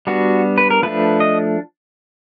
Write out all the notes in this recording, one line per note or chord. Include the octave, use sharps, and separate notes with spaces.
G3 B3 D4 F#4
B4
A#4
F3 A3 D4 B4
D#5